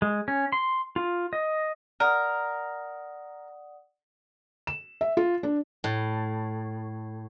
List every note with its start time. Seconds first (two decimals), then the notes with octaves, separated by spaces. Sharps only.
0.02 G#3
0.28 C#4
0.52 C6
0.96 F4
1.33 D#5
2.00 A#4 D5 F#5 D#6
4.67 E7
5.01 E5
5.17 F4
5.43 D4
5.84 A2